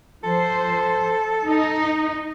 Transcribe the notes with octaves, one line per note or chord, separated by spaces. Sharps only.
F3 A4 C5
D#4